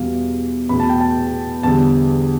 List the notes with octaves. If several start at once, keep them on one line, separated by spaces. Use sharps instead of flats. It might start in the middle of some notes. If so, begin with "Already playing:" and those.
Already playing: E2 B2 G3 F5
E2 B2 A3 B5
A5
G5
A5
E2 D3 G3 A5